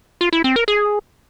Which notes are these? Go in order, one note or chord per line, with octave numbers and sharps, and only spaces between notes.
F4
E4
C4
A#4
G#4